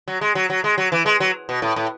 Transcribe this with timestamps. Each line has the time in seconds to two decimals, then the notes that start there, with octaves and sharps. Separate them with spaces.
0.08 F#3
0.21 G#3
0.35 F#3
0.50 F#3
0.64 G#3
0.78 F#3
0.92 E3
1.06 G#3
1.20 F#3
1.49 B2
1.62 A2
1.76 A2